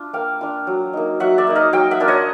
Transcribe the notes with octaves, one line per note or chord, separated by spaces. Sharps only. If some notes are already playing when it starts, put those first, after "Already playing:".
Already playing: D4 F4
A#3 F5 G5
D4 F4
F#3
A#3 D#4
F#3 E5 F#5
D5 E5
A#3 D#4
D#5 F5
F#3 F5 G5
E5 F#5
A#3 D4 F4
C#5 D#5